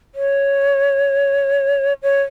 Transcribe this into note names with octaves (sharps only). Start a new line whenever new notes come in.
C#5
C#5